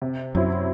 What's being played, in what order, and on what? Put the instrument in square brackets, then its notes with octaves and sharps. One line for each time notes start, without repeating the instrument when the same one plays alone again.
[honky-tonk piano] C3
[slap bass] F#2 [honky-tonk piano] F#3 C4 E4